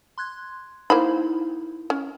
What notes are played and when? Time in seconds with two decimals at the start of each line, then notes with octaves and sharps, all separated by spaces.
0.18 C6 F#6 G#6
0.90 A#3 D#4 E4 C5 B5
1.90 C#4